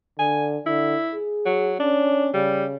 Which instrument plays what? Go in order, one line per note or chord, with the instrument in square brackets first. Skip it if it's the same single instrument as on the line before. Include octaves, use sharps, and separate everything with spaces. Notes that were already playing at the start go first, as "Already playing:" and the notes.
[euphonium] D3 [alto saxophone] G#5
[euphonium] D3 [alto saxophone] E4
[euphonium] G#4
[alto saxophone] F#3
[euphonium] C#4 [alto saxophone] D4
[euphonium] C#3 [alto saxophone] G3